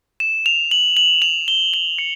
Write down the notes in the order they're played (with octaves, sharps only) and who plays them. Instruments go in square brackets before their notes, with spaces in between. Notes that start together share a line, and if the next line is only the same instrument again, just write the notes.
[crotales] E7
F7
F#7
F#7
F7
G7
F#7
C#7